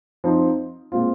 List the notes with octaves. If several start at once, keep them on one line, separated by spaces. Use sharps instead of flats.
F3 C4 D#4
A#2 G#3 C4 F4